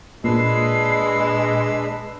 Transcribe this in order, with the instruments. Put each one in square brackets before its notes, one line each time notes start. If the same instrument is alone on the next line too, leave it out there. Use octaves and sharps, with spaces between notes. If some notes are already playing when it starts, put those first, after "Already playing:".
[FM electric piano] A#2 [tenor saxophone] G#3 [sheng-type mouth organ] D4 B4 E6 [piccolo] C7